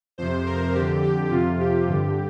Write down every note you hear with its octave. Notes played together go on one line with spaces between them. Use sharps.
F2 C3 C5
A#4
F2 D3 G4
G4
F2 C3 F4
G4
G2 D3 G4